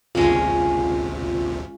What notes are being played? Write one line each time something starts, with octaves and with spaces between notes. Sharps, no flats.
G#1 D2 C3 G#3 C#4 F4 B5